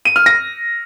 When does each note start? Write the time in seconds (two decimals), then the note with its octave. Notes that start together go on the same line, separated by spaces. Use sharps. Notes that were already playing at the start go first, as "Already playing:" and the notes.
0.05 D#7
0.16 F6
0.26 A#6